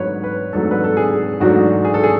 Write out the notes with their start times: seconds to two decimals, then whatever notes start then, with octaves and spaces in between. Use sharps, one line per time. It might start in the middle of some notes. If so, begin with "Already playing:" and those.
Already playing: G#2 F#3 A3 D4 B4 C#5
0.24 B4
0.53 G#2 F#3 A3 D4 A4
0.71 B4
0.84 A4
0.97 G#4
1.40 G#2 F#3 A3 D4 F#4
1.85 G#4
1.94 A4
2.04 G#4